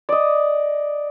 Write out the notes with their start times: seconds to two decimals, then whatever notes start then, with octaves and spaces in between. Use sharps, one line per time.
0.09 D5 D#5